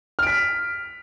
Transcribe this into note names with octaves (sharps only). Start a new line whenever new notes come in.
F6 B6 D7